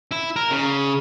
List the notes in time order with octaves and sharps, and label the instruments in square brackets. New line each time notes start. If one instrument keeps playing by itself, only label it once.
[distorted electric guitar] E4
A#4
C#3